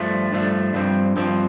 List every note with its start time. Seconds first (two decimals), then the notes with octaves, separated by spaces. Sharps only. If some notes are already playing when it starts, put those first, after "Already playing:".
Already playing: G2 F3 A3 D4
0.32 G2 F3 A3 D4
0.74 G2 F3 C4
1.16 G2 F3 C4